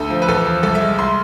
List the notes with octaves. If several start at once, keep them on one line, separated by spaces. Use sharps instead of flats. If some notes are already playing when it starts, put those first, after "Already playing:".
Already playing: D2 A4
F3
B4
E2 A4
F3
C2 A4
E5
G#3
C2 C6